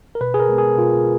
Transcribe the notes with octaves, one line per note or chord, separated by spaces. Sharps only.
A#4
B2 B4
G#4
A#4
G#3 B3
G#4
B2 F4